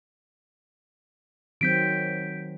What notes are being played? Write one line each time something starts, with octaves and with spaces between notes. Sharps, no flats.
D#3 F#3 C4 G6 B6 D7